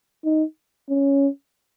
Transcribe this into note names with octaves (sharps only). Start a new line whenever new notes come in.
D#4
C#4